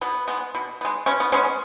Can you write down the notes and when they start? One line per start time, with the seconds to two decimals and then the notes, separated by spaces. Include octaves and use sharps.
0.01 B2 B3
0.27 G#3 B3
0.55 B2
0.81 G#3 B3
1.06 B2 C#4
1.20 B3
1.32 G#3 B3 C#4